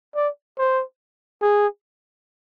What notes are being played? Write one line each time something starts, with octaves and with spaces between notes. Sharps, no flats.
D5
C5
G#4